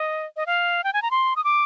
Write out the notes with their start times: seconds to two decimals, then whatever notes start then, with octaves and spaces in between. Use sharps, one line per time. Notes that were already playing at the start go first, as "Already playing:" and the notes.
Already playing: D#5
0.37 D#5
0.46 F5
0.84 G5
0.93 G#5
1.02 A#5
1.11 C6
1.36 D#6
1.44 D6